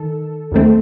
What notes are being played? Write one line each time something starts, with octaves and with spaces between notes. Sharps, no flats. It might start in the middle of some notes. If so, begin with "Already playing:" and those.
Already playing: D#3 A4
D#2 D#3 A3 C4